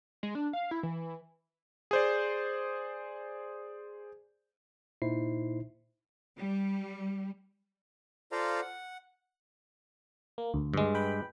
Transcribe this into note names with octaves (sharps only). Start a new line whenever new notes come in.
G#3
D4
F5
E4
E3
G#4 C5 D5
A#2 D#4 E4 C5 C7
G3
F4 A4 C5 D5 F5 A#5
F#5
A#3
D2
G2 G#3
B4 G5 B5